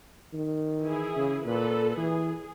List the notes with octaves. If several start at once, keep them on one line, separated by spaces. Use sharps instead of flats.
D#3
E3 E4 G#4
C#3
A#2 A4 B4
E3 G#4